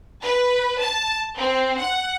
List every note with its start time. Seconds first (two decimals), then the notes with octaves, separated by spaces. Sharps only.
0.22 B4
0.80 A5
1.36 C4
1.78 F#5